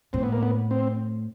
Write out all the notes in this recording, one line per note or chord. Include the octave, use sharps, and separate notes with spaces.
A2 C4
B3
A#3
B3
C4